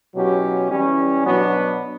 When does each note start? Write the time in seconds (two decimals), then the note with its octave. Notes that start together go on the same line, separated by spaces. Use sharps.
0.15 B2 F#3 C#4 E4 G4
0.71 E3 G3 C#4
1.26 B2 F#3 B3 D4 F#4